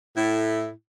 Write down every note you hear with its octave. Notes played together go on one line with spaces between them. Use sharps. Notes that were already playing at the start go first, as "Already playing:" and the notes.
A2 E4